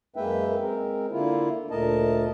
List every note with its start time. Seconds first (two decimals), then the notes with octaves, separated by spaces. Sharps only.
0.16 F#2 G#3 A#3 B4 E5 G5
0.60 G#3 C4 A#4
1.12 D3 A#3 E4 F4
1.71 D2 A#2 A3 A#4 D#5 A5